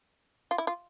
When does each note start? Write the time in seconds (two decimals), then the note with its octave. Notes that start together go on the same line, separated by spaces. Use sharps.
0.51 F4
0.58 E4
0.67 F4